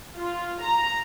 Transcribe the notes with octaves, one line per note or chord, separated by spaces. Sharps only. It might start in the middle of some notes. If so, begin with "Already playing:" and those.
F4
A#5